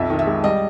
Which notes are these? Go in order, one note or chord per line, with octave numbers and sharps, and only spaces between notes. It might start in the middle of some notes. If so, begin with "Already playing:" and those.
Already playing: B1 F2 E5
D#3
E5
G#3
G3 D#5